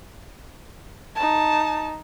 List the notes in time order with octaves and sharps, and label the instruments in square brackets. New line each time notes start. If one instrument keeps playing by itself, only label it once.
[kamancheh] D#4 A5